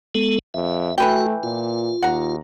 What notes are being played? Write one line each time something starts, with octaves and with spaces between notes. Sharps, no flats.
G#3 B3 A4
F2 E5
E3 A3 F#4 B4 G5
A#2 F4
D#2 F#5 A#5